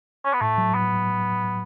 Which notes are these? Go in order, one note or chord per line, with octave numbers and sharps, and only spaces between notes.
C#4
B3
A2 A3
F#3
A2 B3